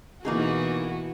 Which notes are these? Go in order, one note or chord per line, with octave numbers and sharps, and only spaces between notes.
B2 E3 A#3 D#4 F#4 G#4